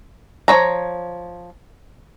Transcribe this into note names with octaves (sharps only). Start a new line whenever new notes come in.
F3 D#4 C#5 A#5